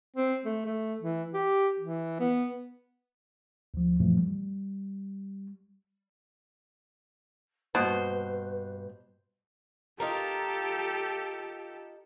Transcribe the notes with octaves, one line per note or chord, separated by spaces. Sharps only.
C4
A3
A3
E3
G4
E3
B3
D2 F3
F#2 A#2 E3 F3 A3
G3
G2 B2 A#3 B4 C5
D#4 F4 G4 A4 A#4